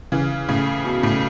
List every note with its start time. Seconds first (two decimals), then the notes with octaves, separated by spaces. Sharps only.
0.12 C#3 E3
0.49 A2 C#3
0.85 B2
1.03 A2 C#3